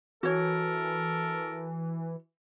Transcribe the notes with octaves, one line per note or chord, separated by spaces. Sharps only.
E3 F#4 A4 A#4 C#5